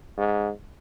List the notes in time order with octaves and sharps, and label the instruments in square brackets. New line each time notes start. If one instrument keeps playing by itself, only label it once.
[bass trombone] G#2